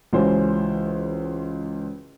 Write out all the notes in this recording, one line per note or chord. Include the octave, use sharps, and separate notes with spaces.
C#2 E3 C#4 F#4 C5